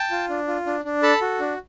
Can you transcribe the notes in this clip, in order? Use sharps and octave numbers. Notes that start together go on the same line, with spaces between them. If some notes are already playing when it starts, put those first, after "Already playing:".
Already playing: G5 A5
F4
D4
F4
D4
D4
A4 A5 B5
F#4
D4